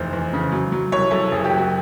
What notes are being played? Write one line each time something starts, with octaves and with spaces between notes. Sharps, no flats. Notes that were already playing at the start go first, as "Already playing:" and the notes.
Already playing: F1 E2 C5
E2
C#3
F#3
F#3
C2 C#5
C2 A4
F#1 G#4
G4
F#3
F#4